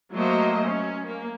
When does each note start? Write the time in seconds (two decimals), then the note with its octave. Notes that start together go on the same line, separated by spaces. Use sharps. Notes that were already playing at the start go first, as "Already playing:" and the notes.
0.13 F#3 A3 A#3 C5 D#5
0.63 C#4
1.06 A#3